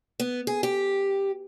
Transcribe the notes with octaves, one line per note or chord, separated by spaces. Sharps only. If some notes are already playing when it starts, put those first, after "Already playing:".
B3
G#4
G4